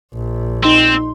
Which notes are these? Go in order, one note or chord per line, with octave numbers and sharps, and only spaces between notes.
A#1
C4 D#4 C6